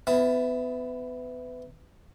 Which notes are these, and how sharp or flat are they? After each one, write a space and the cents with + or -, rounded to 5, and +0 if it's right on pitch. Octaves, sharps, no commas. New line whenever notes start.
B3 +25 E4 +0